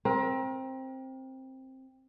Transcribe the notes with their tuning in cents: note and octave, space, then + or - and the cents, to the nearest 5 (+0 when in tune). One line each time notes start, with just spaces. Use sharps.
C4 +10 A#4 +35